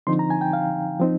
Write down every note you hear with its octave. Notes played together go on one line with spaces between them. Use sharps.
D3 F3 C4 D#4 C6
A#5
G#5
G5
F5
F3 C4 D#4